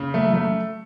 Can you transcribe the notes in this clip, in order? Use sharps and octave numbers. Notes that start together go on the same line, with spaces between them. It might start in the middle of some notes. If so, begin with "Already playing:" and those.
Already playing: C#3
F#3 A3
F3
F#3 A3